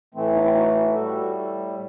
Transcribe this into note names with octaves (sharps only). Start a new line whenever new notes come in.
A2 E3 A3 C4
B3 D#4
C4 E4
D#4 F#4
A2 G3 F#4 A4